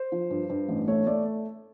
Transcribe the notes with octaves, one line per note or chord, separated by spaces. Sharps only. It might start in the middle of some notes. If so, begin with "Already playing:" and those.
Already playing: C5
F3
G2
G2
A1
A3 C#5
A3 D5